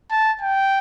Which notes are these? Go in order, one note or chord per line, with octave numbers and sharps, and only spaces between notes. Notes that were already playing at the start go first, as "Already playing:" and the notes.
A5
G5